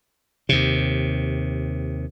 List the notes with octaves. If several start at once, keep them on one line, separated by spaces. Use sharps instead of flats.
D#2 C3